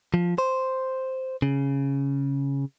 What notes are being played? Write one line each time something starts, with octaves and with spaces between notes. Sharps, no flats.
F3
C5
C#3